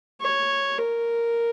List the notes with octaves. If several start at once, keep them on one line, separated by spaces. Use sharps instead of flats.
C#5
A#4